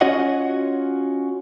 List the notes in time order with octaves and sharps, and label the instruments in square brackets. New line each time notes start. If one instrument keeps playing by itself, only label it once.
[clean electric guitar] C#4 F4 F#4 C#5 D#5 F#5